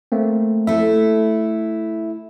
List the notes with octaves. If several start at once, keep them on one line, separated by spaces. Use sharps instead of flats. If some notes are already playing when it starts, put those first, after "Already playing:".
A3 A#3 C4
A3 E4 E5